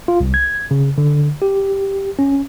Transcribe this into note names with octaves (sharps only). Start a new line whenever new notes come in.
F4
C2
G#6
C#3
D3
G4
C#4